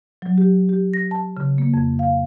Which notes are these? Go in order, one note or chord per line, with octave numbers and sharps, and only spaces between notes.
F#3
G4
G4
A#6
A5
C#3
A#3
F2
F5